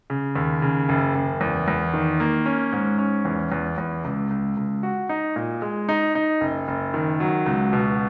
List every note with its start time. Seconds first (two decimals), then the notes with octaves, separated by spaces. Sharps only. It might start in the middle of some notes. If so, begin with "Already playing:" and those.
0.10 C#3
0.35 D#2
0.62 C#3
0.89 F#1
1.15 F#1
1.41 E2
1.68 E2
1.93 D#3
2.20 A#3
2.46 C#4
2.72 G#2
2.98 C#4
3.25 E2
3.52 E2
3.78 E2
4.04 C#2
4.30 C#2
4.57 C#2
4.83 F#4
5.09 D#4
5.36 A#2
5.62 G#3
5.89 D#4
6.15 D#4
6.41 F#1
6.68 F#1
6.94 D#3
7.20 F#3
7.46 C#2
7.73 B2